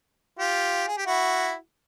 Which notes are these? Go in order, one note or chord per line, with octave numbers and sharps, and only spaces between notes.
F4 G4
G#4
G4
E4 F#4